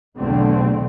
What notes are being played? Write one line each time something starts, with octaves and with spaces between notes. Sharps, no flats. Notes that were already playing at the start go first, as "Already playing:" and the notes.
B1 E2 B2 D3 A3 C4